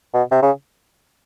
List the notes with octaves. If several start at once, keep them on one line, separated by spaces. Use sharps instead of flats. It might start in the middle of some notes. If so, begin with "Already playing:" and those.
B2
C3
C#3